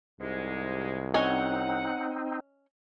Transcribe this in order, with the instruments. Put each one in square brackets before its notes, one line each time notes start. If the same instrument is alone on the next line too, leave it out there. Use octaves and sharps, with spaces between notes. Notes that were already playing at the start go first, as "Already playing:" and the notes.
[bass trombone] C2 [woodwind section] G#2 C3 G#3
[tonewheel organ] C4 D#4 [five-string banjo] C#4 D#5 G#5 [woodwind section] F#5